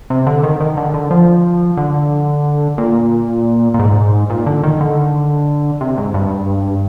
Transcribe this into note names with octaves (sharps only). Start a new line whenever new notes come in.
C3
D3
D#3
D#3
D3
D3
F3
D3
A#2
A#2
G#2
A#2
D3
D#3
D3
C3
G#2
G2